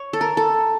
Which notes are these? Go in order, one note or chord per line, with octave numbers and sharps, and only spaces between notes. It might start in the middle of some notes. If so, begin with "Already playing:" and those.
Already playing: C#5
A4
A#4
A4